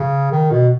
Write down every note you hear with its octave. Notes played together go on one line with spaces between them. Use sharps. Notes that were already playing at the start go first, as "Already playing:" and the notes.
Already playing: C#3
D#3
B2